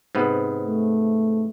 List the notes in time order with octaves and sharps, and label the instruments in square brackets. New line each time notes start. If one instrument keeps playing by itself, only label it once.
[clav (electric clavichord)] G#2 C3 B3
[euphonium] A3